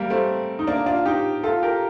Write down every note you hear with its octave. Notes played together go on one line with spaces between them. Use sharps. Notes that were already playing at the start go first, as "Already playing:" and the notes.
Already playing: G3 A#3
A3 C4
D#4
A#3 D4
D4 F4
D#4 G4
F4 A4
G4 A#4